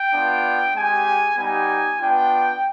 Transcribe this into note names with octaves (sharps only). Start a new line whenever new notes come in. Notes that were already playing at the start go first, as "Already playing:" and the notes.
Already playing: G5
B3 D4 F4
G#3 C4 G4 G#5
G3 B3 D#4 G4 G#5
B3 D4 F4 G5